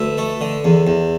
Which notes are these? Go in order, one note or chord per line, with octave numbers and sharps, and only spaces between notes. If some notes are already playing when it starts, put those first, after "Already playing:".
Already playing: D2 B4 E5
A3
D3
E2
E2